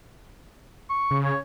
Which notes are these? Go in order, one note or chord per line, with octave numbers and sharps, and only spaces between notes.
C#6
C#3
C#5